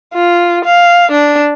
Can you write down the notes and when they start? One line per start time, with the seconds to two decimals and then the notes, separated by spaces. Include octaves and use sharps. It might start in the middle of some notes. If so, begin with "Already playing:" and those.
0.14 F4
0.65 F5
1.12 D4